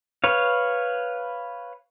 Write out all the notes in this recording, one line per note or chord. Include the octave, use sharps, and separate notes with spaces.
B4 C#5 F5